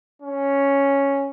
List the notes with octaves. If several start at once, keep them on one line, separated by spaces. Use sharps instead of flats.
C#4